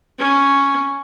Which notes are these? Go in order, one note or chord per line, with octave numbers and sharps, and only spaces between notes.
C#4